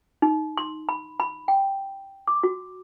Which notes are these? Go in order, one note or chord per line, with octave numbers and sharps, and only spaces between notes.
D#4
C6
B5
B5
G5
D6
F#4